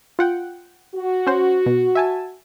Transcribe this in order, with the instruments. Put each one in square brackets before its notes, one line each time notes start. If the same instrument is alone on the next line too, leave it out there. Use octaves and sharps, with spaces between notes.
[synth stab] F4 F#5 G5
[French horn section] F#4
[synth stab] C#4 C5
B2
E5 G#5 A5